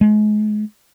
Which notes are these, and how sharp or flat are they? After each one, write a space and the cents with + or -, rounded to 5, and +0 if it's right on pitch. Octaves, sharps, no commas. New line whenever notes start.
G#3 +35